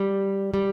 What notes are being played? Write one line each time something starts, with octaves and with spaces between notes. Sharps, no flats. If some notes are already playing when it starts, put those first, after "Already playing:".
Already playing: G3
G3